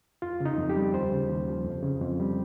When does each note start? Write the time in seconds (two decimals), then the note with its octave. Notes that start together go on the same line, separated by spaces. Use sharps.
0.22 F2 F4
0.40 C#3
0.45 D#4
0.58 F2
0.69 G4
0.76 G3
0.94 D#2 C5
1.12 C#3
1.30 D#2
1.48 F3
1.65 F2
1.83 C#3
2.01 F2
2.20 G3